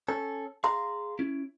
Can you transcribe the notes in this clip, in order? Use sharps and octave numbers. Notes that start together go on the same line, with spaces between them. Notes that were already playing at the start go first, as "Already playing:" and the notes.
C#4 A4
G#4 F5 A#5 C6
C#4 E4